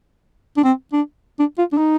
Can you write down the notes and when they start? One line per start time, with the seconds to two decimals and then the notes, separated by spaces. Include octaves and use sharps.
0.57 D4
0.64 C4
0.93 D4
1.39 D4
1.58 F4
1.73 D4
1.78 D#4